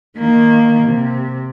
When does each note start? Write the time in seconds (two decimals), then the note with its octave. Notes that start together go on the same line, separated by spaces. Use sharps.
0.18 D#3 A#3
0.84 C3